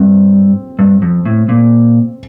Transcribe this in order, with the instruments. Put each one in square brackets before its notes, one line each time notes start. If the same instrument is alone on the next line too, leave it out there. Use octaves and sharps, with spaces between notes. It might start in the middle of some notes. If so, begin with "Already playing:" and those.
Already playing: [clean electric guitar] G2 [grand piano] C4
[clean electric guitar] G2
F2
A2
A#2